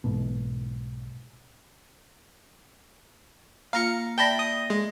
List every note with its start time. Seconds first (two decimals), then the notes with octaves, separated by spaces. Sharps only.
0.04 B1 G#2 B2
3.73 A#3 F4 F5 A#5 C#7
4.18 D5 E5 G5 A5 B5 A#6 G7
4.39 D#6
4.70 G#3